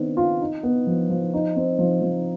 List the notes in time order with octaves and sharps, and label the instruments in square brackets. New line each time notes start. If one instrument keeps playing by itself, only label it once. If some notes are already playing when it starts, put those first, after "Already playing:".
Already playing: [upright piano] D#3 B3 C4 D4
F4
D#4
B3
F3
F3
D#4
C4
F3
F3